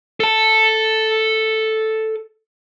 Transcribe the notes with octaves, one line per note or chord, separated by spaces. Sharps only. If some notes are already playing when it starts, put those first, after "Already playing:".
A4 A5